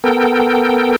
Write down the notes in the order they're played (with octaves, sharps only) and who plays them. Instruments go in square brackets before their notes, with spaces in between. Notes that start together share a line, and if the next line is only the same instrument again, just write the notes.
[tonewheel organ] B3 A4 A#4 G5